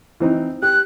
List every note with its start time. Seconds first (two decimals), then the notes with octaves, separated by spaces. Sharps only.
0.20 E3 C4 D#4
0.62 G4 F#6